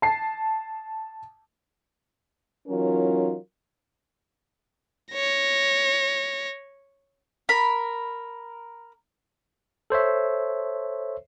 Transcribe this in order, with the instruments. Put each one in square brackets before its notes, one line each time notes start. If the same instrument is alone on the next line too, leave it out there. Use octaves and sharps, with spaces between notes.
[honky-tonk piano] A5 C7
[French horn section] E3 F#3 C#4 D#4 F4 A#4
[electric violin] C#5 A#6
[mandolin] A#4 B5
[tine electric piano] A4 C5 C#5 E5